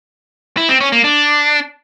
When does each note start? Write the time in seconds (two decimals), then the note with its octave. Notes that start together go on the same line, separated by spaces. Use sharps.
0.57 E4
0.69 C4
0.81 C#4
0.92 A#3
1.04 D4